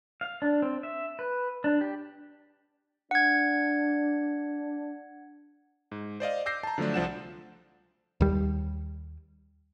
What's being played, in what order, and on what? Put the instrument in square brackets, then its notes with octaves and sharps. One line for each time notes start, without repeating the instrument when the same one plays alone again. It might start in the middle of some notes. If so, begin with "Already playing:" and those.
[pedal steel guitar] F5
D4
C4
E5
B4
D4
G4
[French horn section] D4 [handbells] F#5 G#6
[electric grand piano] G#2
C5 D5 D#5 F5
D6 E6 G6 A#6 C7
A5 A#5
D3 F3 F#3 A3 D4
C2 F3 D5 F#5 A5 E7
[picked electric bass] D#2 G3